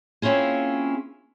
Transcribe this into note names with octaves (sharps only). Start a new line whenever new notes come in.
A#3 C4 C#4 E4 F4 G#4